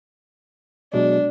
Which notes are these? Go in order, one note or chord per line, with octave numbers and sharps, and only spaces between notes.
B2 F#3 G#3 D4